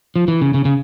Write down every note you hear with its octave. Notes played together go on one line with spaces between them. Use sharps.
F3
E3
C#3
C#3
C#3